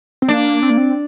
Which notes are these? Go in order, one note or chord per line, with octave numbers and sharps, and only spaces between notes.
C4
A#3 D4
C4
A#3
C4